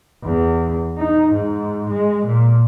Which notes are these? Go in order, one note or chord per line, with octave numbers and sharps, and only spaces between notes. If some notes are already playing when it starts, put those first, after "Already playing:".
E2
D#4
G#2
G#3
A#2